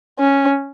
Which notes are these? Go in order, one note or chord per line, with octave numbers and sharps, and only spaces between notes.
C#4